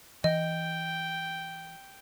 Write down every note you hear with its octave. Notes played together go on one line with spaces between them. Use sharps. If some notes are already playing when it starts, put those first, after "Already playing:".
E3 D#5 G5